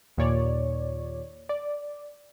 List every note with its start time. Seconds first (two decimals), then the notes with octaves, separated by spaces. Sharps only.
0.17 D#2 A#2 C#5 D5
1.49 D5